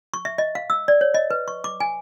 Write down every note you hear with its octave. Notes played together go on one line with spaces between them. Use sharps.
C#6
E5
D#5
F5
E6
D5
C#5
D#5
B4
C#6
D6
G#5